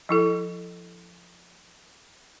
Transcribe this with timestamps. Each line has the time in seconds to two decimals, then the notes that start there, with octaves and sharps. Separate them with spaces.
0.09 F3 E4 A4